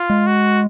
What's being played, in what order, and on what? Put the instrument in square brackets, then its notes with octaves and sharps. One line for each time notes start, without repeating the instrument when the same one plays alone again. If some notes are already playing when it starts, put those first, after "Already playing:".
Already playing: [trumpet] F4
[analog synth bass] G#3
[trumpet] F#4